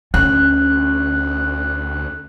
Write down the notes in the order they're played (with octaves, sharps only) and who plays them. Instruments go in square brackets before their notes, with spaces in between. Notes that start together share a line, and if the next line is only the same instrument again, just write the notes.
[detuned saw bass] D2 [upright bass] C#4 [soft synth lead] F#6